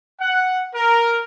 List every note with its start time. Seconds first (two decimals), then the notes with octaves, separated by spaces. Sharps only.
0.20 F#5
0.74 A#4